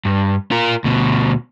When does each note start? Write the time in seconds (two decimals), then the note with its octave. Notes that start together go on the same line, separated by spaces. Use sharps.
0.05 G2
0.51 F4 A#4
0.84 D2 B2